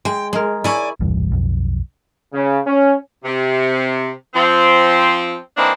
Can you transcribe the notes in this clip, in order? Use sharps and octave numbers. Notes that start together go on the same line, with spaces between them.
G#3 G5
G#3 G#4 A#4
E4 C#5 D5 G#5
E1 C2 G2 E3
B1 F2
C#3
C#4
C3
F3 C4
E3 A#3 C4 D4 D#4 C5